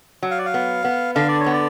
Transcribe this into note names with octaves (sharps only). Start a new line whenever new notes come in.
F#3
F5
D5
F5
B3
B3
D3 F5
D5
C#5
B3
D5